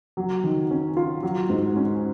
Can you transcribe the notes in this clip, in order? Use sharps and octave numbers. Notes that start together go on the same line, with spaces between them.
F#3
D#3
C#4
F4
F#3
G#2
C#4